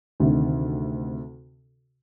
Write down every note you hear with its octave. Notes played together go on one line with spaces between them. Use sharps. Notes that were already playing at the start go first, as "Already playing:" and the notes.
D2 C3 D#3